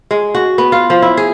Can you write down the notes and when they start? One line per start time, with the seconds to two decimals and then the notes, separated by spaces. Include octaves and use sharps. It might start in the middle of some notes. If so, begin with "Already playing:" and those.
0.11 G#3
0.35 F#4
0.58 B3
0.72 F4
0.90 F3
1.02 E4
1.17 G#4